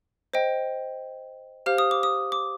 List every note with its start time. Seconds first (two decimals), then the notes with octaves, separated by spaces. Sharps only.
0.33 C5 D#5 G5
1.66 G4 C5 F5 F6
1.78 D#6
1.91 D6
2.03 D#6
2.32 D6